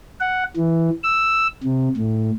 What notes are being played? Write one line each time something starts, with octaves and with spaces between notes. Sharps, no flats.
F#5
E3
E6
C3
A2